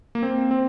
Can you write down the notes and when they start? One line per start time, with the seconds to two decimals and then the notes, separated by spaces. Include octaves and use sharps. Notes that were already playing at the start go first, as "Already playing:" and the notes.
0.15 A#3
0.23 C4
0.51 C4